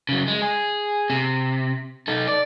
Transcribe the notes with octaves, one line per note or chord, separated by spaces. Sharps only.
C#3 F#3
G#3
G#4
C3
D#4 A4
D5